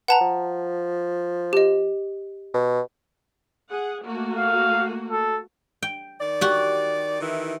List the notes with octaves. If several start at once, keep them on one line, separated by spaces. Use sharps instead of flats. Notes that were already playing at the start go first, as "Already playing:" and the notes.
B4 F#5 A5 A#5
F3
G4 D#5
B2
G#4 F#5
A3 A#3 F#4
F5
A4
G5
D#3 D5
F#4 G4
D#3 E3 E4